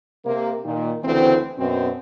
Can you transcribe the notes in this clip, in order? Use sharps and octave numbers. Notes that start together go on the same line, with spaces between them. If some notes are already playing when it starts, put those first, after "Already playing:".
C3 A#3
A#2 D#3
D2 C#3 E3 C4
F#2 B2 B3 C4